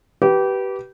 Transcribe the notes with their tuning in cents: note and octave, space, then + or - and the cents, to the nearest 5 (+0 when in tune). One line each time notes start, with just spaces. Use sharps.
G4 -25 B4 -15